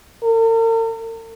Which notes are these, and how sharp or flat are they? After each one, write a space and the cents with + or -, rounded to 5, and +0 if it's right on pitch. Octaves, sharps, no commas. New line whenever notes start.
A#4 -45